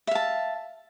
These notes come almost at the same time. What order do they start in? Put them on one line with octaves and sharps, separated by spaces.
E5 F5 A5